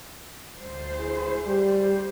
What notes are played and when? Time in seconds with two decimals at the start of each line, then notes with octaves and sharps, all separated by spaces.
0.58 D2 C5
0.96 E4 G#4
1.46 G3 G4
1.77 G4 C5